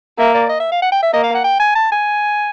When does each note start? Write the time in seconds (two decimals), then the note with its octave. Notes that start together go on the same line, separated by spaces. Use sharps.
0.18 A#3 E5
0.34 D5
0.50 D#5
0.60 E5
0.72 F5
0.82 F#5
0.92 G5
1.03 E5
1.13 A#3 D#5
1.24 F5
1.35 F#5
1.44 G5
1.60 G#5
1.75 A5
1.92 G#5